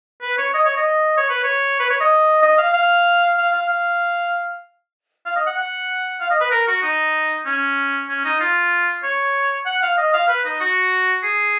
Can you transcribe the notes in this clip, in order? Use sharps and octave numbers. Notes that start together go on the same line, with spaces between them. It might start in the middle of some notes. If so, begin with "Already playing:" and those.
B4
C#5
D#5
C#5
D#5
C#5
B4
C#5
B4
C#5
D#5
D#5
F5
F5
F5
F5
F5
F5
D#5
F#5
F#5
F5
D#5
B4
A#4
F#4
D#4
C#4
C#4
D#4
F4
C#5
F#5
F5
D#5
F5
B4
D#4
F#4
G#4